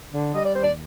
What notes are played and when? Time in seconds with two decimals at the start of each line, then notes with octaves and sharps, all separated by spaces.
0.14 D3
0.34 G3 D#5
0.45 D5
0.54 D#2 C5
0.64 D5